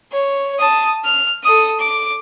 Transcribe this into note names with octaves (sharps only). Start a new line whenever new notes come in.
C#5
A5 D#6
F6
A4 D#6
D6